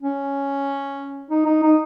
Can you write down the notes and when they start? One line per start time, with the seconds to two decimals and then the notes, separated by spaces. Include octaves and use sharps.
0.01 C#4
1.30 D#4
1.45 D#4
1.63 D#4